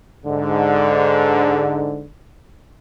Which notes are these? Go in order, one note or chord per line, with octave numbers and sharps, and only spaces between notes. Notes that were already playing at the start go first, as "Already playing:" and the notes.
G#2 D3